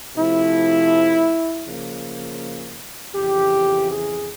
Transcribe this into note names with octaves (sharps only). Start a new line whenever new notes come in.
C3 F3 A3 E4
C#3 F3 A#3
F2 C#3 E3 G4
G#4